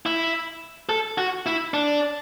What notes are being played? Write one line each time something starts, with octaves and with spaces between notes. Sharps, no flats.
E4
A4
F#4
E4
D4